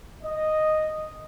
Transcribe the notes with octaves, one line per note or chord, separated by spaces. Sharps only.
D#5